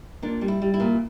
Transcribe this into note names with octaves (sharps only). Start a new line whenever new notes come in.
A#2 D4
G3
E4
G3
E4
A#2